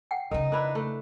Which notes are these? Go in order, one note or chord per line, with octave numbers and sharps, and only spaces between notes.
F#5 G5
F2 C#3 D#4 A#4
D4 E4 A#4 B4 B5
A3